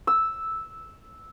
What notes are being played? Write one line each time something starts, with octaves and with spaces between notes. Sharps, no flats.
E6